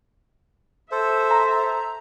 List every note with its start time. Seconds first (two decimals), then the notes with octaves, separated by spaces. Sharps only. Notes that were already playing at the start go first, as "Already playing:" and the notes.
0.91 A4 C5 E5
1.31 A#5